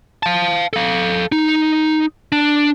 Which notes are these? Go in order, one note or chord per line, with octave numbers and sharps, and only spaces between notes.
F5 A5
A4 F5
D#4
D4